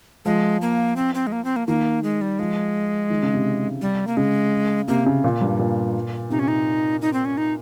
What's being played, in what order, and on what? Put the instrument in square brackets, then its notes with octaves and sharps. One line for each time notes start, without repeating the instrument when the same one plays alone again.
[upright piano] F3 [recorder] G#3
[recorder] A#3
C4
C4
G#3
A#3
C4
A#3
[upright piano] D#3 [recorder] A#3
[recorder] G#3
G3
[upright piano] F3 [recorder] G#3
[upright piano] D#3
C#3
C3
[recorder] G3
A#3
[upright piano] C#3 [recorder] G#3
[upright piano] C3 [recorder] A#3
[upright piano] C#3
A#2
G2
A#2
[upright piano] C3 [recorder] D#4
[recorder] C#4
D#4
D#4
C4
C#4
D#4